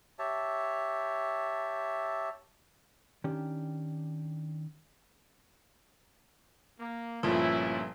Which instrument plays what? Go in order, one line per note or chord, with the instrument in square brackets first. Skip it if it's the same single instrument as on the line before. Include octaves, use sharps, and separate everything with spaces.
[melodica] G4 C#5 E5 A5
[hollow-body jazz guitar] D#3 C#4 D4 G4
[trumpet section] A#3
[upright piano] G1 A#2 F3 [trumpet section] C#4 E4